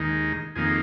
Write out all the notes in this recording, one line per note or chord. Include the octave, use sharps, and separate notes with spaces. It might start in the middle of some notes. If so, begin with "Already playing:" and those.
Already playing: D#2 D#3 G#3 D#4
F2 D#3 A#3 D#4 G#4